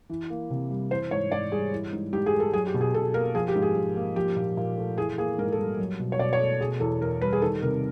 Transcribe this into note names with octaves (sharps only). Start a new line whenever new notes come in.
E3
A#3
C3
G3
E3 C5
G#2 C#5
G#2 D5
G3 G#4
E3
G#2
G#2 G4
G#4
A3
A4
F#3 G#4
G4
B2
G#4
B2 A4
A#3 A#4
F3 G#4
G4
G#2
G#4
G#2
A#3
F3 G4
A#2
A#2
A3
E3 G#4
A#3 G#4
G#2 A#4
A4
G3
F#3
B2
C#5
B2 D5
C#5
A3
B2 G#4
E2 A4
E2 A#4
G3 B4
G#4
D#3 A4
C3 A#4